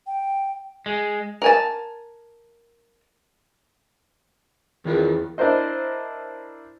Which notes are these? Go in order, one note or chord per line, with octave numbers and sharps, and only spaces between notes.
G5
G#3
A#4 G#5 A5
E2 D#3 F4 A#4
D4 E4 A#4 C5 D#5